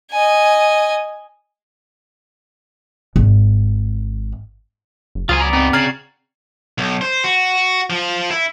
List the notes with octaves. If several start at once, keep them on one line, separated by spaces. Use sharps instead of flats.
D#5 G#5
G#1
F#1
C#2 F#3 C#4 F4 C5 G#5 D#6
B3 D5 A#5
G2 C4 D#4
C#3 F#4 D5 A#5 F6 G#6 C7
B1
C5
F#4
F3
E4